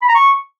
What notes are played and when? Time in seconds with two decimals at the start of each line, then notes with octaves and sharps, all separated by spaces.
0.02 B5
0.09 A#5
0.15 C#6